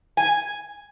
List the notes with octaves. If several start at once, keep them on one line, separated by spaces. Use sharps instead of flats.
G#5